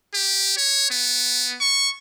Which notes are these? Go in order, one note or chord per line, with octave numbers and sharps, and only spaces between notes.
G4
C#5
B3
C#6